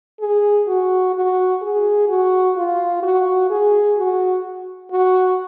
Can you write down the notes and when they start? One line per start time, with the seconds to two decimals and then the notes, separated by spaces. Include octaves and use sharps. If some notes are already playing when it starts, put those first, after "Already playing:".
0.20 G#4
0.67 F#4
1.14 F#4
1.62 G#4
2.09 F#4
2.56 F4
3.03 F#4
3.50 G#4
3.97 F#4
4.91 F#4